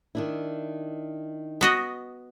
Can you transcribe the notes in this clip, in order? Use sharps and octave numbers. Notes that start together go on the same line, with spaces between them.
D#3 D4 E4
B3 F#4 D#5